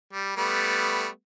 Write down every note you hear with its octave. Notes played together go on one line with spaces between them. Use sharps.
G3
G3 A3 B3